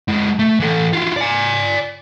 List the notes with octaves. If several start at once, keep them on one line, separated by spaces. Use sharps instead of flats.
G#3 E4
A3
E3 A4
E4 F4
D5 G#5